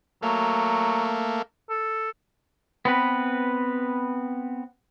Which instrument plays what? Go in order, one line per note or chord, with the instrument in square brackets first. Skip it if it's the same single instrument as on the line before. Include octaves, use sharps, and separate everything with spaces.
[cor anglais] F#3 [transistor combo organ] A3 A#3
[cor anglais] A4
[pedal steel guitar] B3 C4 B4